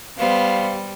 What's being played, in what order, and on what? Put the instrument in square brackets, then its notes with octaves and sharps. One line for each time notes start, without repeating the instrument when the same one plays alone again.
[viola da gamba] G3 [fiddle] B3 C5 [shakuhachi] F5